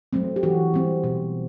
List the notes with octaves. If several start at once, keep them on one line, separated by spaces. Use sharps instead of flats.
F#3 A3 C4
G4
E3 F#4
G3 C4
B2